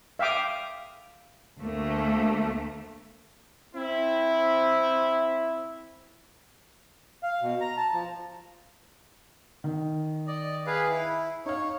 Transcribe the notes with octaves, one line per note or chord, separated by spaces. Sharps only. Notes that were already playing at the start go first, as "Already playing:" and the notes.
E5 F5 G5 D6 D#6
D2 A3 A#3
C4 E4
F5
B2
A#5
A5
F3
D#3
D5 D#5
G#4 B4 F5
E4
D#4 C#5 F5